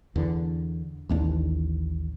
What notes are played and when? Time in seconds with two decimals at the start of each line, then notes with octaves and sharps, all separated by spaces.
0.16 E2 D3
1.09 A1 D#2 A#3 D4